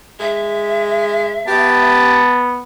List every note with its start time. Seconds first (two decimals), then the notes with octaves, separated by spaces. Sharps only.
0.20 G#3 E5
1.48 B3 G4 A5